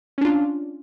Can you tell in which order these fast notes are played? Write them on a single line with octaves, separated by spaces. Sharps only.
C#4 D4 F4